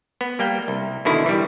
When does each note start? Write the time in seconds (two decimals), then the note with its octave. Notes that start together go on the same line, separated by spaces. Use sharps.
0.21 B3
0.39 G3 A#3 G5
0.68 C2
1.05 B2 D3 D#3 E4
1.26 E3 G3